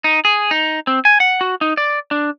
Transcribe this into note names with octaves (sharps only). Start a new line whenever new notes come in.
D#4
G#4
D#4
C4
G#5
F#5
F#4
D#4
D5
D4